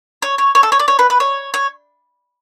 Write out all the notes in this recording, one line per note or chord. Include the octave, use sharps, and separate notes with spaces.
C#5
C#5
C#5
A4
C#5
D5
C#5
B4
B4
C#5
C#5